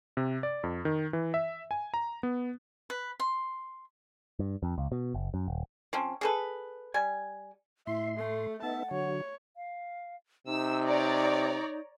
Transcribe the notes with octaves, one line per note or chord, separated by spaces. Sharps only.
C3
D5
F2
D#3
E3
E5
G#5
A#5
B3
B4
C6
G2
F2
C#2
B2
F#1
F#2
D#1
F3 C4 C#4
G#4 A4 B4
G3 G#5
A2 E4 E5 C6
A3 A4
B3 D#4 E5 F#5 A5
D3 F#3 C#5
F5
C3 D#4 E6
C#5 D5 A#5